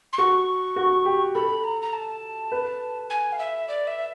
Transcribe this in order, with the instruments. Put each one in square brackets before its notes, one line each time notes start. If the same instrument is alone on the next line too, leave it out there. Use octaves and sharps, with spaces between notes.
[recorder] C6
[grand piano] F#4 [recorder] C#6
[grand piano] F#4
G4
[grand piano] A4 [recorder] B5
[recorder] A#5
A#5
A5
[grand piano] B4
[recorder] G#5
F5
E5
D5
E5